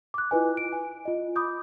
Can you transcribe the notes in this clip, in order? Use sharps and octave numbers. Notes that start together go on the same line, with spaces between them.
D6 F#6
E4 F4 B4 D#5 G#5
D7
G#5
F4 D#5
B5 D6 D#6 G6